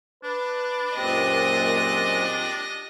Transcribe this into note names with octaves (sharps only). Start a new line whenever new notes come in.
D4 B4
F#2 A#2 G#3 C4 G4 D#5